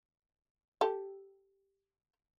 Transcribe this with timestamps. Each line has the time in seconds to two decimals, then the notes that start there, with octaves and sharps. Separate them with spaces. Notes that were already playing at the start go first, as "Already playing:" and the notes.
0.81 G4 A4